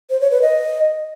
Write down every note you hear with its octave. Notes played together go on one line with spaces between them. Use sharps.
C5
C#5
B4
D#5